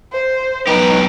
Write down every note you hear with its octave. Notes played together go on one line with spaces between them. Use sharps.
C5
B1 D#4 G4 B4